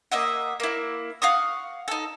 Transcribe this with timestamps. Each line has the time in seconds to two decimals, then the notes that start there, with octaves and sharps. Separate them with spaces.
0.12 A#3 D#5 E5 F#5
0.60 A#3 E4
1.22 F5 F#5 C#6 D#6
1.88 D#4 A4